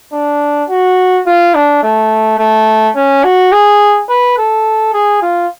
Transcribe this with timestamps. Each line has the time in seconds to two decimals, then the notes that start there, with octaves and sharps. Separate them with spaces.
0.13 D4
0.69 F#4
1.26 F4
1.54 D4
1.83 A3
2.39 A3
2.96 C#4
3.24 F#4
3.52 G#4
4.09 B4
4.38 A4
4.94 G#4
5.22 F4